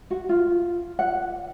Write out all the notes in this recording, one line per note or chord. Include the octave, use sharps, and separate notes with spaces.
F#4
F4
F#5